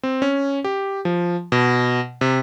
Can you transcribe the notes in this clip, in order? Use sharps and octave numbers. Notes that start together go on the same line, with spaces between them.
C4
C#4
G4
F3
B2
C3